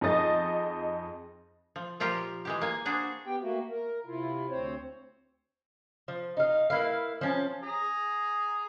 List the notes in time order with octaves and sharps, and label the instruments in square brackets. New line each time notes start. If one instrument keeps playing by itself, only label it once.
[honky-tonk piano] F2 D#4 G#4 D#5 A6
[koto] F3
A#2 F3 F4 G4 A#4
E3 G#3 G4
A#3 G#5
D4 F#4 G#4 C5
[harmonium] B3 G4 G5
A3 A#3 F#4
A#4
C3 E4 F4
D2 C4 C5 C#5
[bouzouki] F3
D#4 F5
A#3 E4 B4 F5
F3 C#4 A5
[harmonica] G#4 A#5